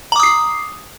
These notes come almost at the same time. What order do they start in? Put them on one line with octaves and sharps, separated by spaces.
A#5 D6 D#6 C7